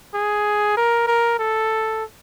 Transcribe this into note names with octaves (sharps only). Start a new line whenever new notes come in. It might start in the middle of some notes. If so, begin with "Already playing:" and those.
G#4
A#4
A#4
A4